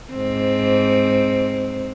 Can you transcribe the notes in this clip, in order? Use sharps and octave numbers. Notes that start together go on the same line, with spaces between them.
G#2 C4